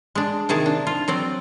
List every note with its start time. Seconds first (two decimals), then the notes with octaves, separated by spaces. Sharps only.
0.15 G#3 D4
0.49 C3 D#3 G#4 A5
0.66 D4
0.87 F4
1.08 F#3 C4 D5